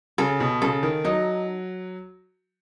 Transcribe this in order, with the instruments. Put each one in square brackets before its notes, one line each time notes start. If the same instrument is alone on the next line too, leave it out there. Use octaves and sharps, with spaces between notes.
[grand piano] C#3 [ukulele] A4
[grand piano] B2
[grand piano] C#3 [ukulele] A4
[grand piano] D#3
[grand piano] F#3 [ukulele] D#4